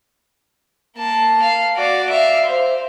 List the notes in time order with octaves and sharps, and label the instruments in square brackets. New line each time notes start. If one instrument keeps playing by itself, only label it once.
[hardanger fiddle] A#3 A5
F5
F#4 D5
E5 F5
C5